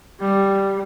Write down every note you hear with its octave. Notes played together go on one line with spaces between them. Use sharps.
G3